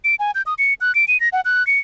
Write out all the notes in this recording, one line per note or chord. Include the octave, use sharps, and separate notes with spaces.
D7
G#5
G6
D#6
C#7
F#6
D7
D#7
A#6
F#5
F#6
C#7